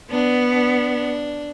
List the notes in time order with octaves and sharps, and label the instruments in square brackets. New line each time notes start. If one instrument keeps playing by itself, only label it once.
[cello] B3 [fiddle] D4
[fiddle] D4